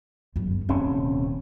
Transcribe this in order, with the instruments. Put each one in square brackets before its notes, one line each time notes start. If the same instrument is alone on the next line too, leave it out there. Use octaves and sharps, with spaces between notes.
[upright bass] G1 F#2
[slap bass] D#1 C4 C#4 [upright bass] C3